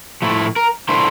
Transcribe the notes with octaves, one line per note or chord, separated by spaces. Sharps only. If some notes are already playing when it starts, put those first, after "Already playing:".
A2 F3 A3 E4
A#4
D3 A3 E4 C5